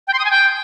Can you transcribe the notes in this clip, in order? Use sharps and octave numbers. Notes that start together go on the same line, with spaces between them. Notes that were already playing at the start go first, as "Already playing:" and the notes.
G5
C6
D#6
G#5
G5